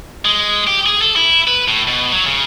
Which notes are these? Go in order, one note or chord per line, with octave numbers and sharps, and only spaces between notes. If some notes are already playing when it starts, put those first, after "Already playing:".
G#3
G4
G#4
A4
E4
B4
A2
B2
F#3
C#3